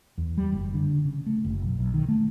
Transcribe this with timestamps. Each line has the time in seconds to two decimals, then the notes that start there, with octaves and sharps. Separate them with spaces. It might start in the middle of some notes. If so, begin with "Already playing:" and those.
0.18 E2
0.37 G3
0.52 F#1
0.74 D3
1.05 C#3
1.26 A3
1.45 F#1
1.63 B1
1.79 B1
1.94 D#3
2.08 A3